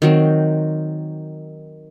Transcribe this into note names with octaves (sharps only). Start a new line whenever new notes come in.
D#3 F#3 C4